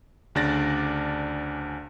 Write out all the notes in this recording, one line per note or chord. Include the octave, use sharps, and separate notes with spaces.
D2 C#3 D4 D5 A6 A#6